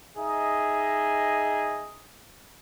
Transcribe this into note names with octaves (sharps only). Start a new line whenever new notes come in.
D#4 G#4 D#5 E5